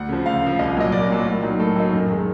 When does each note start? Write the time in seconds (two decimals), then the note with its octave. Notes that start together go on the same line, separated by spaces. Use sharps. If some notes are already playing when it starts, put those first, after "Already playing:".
Already playing: D2 F#5
0.09 C#3 F3
0.25 D2 F5
0.42 C#3 F3
0.59 C2 D#5
0.76 A#2 F#3 D#5
0.92 C2 D5
1.09 A#2 F#3
1.26 A2
1.42 F#3 A#3 D#4
1.59 A2 A4
1.76 F#3 A#3 D#4
1.93 F#2
2.10 D#3 G#3